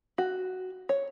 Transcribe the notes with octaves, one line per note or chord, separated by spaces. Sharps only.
F#4
C#5